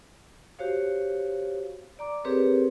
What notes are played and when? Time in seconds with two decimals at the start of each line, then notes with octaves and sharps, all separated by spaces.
0.59 F#4 G4 C5 C#5 F5
1.99 D5 A#5 D6
2.24 C4 G4 G#4 A#4 B4 C#5